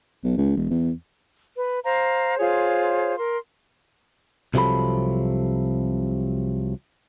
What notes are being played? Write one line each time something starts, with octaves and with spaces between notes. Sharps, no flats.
B1
C#2
E1
E2
B4
C5 F5 A#5
F4 G#4 C5 C#5
A#4 C6
C2 C3 F3 F#3 A4 B5